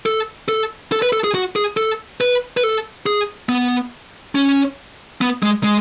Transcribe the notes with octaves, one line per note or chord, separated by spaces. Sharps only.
A4
A4
A4
B4
A4
G#4
F#4
G#4
A4
B4
B4
A4
G#4
B3
C#4
B3
G#3
G#3